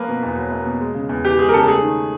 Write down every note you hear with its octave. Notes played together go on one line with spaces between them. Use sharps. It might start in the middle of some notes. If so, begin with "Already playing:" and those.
Already playing: F3 A#3 B4
B2
E2
F#3
A#3
B2
G#3
C#3
E2
E3 G4
G#3 G#4
A#4
C#3 A4
A3 G#4
D#3